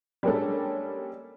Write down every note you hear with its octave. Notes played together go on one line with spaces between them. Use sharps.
G3 G#3 A#3 C#4 D4 A4